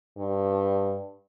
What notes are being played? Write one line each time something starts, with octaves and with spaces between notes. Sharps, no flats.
G2